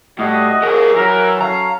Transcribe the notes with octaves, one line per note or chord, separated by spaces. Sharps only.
A2 G3 F#4 D#5
G3 G#4 A#4
E3 F#3 A#4
C#4 A4 F5 A#5